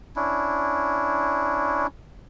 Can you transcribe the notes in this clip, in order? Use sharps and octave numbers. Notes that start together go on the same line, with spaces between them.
C#4 D4 E4